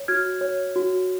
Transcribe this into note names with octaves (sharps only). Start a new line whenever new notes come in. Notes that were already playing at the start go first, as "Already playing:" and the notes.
Already playing: C#5
F#4 F6 G#6
C#5
F#4